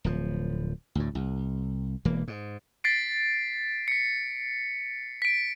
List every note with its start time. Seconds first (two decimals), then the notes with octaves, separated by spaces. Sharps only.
0.04 D1 F3
0.95 D2 A2
1.15 C2
2.05 E1 E3 A#3
2.28 G#2
2.84 A6 B6 C7 D7
3.88 B6 C#7
5.22 B6 D7